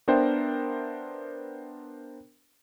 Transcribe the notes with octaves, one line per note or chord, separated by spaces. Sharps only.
B3 D4 A#4 C5 E5 G5